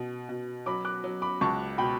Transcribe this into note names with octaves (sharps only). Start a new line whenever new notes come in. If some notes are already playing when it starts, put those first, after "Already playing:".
Already playing: B2
B2
F#3 B5 D6
D6 F#6
F#3
B5 D6
C#2 A5 C#6
B2 G5 B5